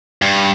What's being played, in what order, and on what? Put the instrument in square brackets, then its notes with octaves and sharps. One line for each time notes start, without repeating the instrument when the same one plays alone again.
[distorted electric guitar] G2